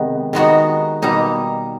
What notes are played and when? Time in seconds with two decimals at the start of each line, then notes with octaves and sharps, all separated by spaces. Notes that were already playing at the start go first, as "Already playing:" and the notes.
Already playing: C3 D#3 G#3 B3
0.33 D#3 G#3 B3 D#4 F#4
1.02 B2 G3 A#3 D#4